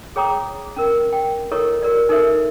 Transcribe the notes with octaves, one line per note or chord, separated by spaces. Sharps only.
G#4 C#5 G5 A#5 D6 D#6
C#4 A#4
G5
E4 A4 A#4 C#5 D#5 C#6
F#4 A#4 D5
D#4 A4 A#4 C5 E5